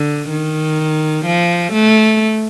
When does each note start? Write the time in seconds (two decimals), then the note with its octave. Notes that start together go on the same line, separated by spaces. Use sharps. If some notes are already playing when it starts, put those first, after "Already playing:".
Already playing: D3
0.30 D#3
1.26 F3
1.73 A3